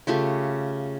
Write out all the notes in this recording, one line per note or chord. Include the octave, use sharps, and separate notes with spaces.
C#3 A3 F4 G4